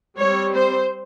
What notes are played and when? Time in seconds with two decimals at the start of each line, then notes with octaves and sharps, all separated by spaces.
0.19 G3 C4 C#5
0.55 C5